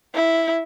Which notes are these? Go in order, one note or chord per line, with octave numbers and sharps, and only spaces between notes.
E4